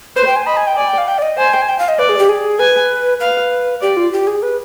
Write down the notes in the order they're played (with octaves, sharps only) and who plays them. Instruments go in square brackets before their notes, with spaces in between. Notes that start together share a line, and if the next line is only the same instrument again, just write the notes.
[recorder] B4 [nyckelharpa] C5
[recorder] G5
G#5
[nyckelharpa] D#5 [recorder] B5
[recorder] G#5
G5
[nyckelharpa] D5 [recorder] G#5
[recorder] G5
F5
G5
D5
D#5
[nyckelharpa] C5 [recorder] G#5
[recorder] G5
G#5
G5
F5
D#5
[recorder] B4 [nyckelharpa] D5
[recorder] G#4
G4
G#4
[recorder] B4 [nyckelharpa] G#5
[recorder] B4 [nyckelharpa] F5
[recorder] G4 [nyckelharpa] D5
[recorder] F4
G4
G#4
B4